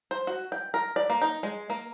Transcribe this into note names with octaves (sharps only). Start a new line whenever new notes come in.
C5
F#4
G5
A#4
D5
A#3
D#4
G#3
A#3